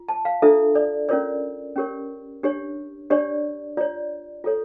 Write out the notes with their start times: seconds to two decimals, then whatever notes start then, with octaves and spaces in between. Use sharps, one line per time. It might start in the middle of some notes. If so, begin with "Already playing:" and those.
Already playing: F4
0.09 A5
0.25 F5
0.42 D4 F4 A4 E5
0.75 D5
1.09 C#4 F4 A#4 C#5 D5
1.76 C#4 G4 A#4 C#5
2.43 D4 G4 C#5
3.10 D4 G4 C#5 D5
3.77 F4 C#5 D5
4.44 F4 A4 C#5